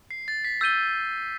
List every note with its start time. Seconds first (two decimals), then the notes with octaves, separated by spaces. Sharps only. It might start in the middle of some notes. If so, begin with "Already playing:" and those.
0.11 C7
0.28 A6
0.45 B6
0.61 E6 G6 A6 D#7 G7